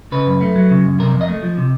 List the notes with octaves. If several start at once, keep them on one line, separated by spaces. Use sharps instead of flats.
C#3 B4
F#2
A3
F#3
C#3
F#2
C3 A#4
F2
D#5
A3
F3
C3